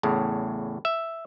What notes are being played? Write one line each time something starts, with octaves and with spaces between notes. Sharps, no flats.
E2 A2 C#3
E5